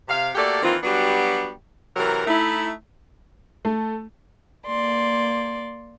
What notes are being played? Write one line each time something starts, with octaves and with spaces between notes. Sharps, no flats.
C3 F5
A3 A#3 F#4 G4 A4 D5
D#3 E3 A#3 C4 F4
F#3 G3 B3 D4 F#4 G4
C3 E3 F#3 A#4
A3 D#4 E4
A3
A#3 D5 C6